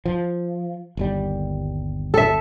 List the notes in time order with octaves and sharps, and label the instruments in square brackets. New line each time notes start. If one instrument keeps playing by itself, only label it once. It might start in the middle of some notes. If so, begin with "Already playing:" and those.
[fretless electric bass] F3
G1 D#2 G3
[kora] A4 E5